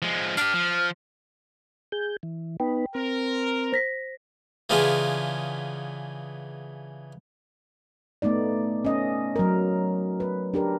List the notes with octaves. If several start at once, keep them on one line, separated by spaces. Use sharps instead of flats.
F3 G#3
D4 G4 F6
F3
G#4 G6
E3
B3 D#4 B4 G5
C4 A#4
C5 A#6 B6
C#3 E3 B3 D4 F4 G#4
A3 B3 D#4 D5
C#4 D#5
F#3 A#4
B4
D4 G4 A#4